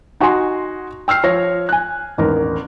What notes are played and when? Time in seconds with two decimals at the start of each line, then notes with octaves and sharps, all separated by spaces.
0.20 D#4 F#4 D#5 G#5 C6
1.08 G5 E6 F6 C7
1.23 F3 C#5 A#6
1.69 G#5 F#6
2.18 E1 A1 D#3 A#4